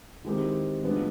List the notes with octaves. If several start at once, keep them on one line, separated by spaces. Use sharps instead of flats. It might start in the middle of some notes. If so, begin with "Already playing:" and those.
D#3 G#3 C4 E4 G4
A2 F3 G#3 B3 D4